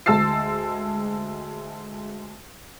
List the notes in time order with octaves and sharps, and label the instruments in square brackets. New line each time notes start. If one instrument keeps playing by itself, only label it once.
[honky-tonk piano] D2 G#3 A5 E6 A6 C7